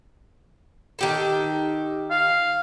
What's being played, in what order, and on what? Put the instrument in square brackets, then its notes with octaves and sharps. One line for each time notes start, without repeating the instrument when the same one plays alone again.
[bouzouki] D#3 G4 A4
[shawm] F5